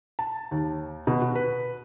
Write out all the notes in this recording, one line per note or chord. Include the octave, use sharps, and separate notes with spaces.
A5
D#2
B2
F#4
B4